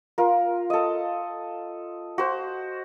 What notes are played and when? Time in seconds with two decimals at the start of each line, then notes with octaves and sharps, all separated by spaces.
0.18 F4 A#4
0.70 A4 D#5
2.18 F#4 C5